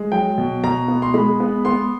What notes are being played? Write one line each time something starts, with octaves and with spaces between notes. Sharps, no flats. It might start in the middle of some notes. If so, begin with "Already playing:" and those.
Already playing: G#3
F#3 G5
B2
B2 A#5
B3
C6
G#3 B5
B3
B3 C6